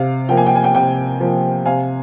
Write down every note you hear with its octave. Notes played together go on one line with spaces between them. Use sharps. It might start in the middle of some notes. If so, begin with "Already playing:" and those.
Already playing: C3 F5
F3 A#3 G5
G#5
G5
G#5
G5
C3 G5
F3 A#3
C3 F5 G#5